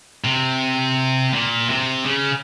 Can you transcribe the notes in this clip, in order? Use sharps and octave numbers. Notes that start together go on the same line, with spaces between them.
C3
A#2
C3
C#3